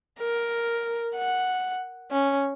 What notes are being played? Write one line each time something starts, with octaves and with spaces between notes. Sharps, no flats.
A#4
F#5
C#4